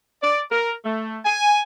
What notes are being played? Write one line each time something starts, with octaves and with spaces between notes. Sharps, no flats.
D5
A#4
A3
G#5